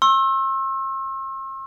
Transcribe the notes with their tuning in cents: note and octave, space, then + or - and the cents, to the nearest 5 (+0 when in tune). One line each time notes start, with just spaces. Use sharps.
C6 +45 E6 +0